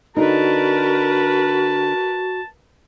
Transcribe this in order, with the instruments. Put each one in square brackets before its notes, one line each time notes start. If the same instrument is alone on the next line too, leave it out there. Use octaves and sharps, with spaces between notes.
[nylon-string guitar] D3 D4 D#4 [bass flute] F#4 [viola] A#4 B4 [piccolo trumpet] A5